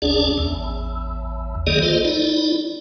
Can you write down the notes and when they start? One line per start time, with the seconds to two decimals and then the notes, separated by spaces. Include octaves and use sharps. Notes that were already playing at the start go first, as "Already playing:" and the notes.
0.02 F#1 D2 C#4 D4 G#4 D5
0.38 A1 E2
1.67 B1 D#3 A#3 G#4 D5 D#5
1.82 F4 A4 C5 D#5
2.05 D#4 E4 D5